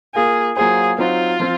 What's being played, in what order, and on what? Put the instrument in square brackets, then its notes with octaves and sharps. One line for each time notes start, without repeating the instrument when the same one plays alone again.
[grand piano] A#3 F4 A#4 [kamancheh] G#4
[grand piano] F#3 A#3 F4 C5 [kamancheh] G#4
[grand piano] F#3 C4 D#4 F#4 C5 [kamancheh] F4
[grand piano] F3 C4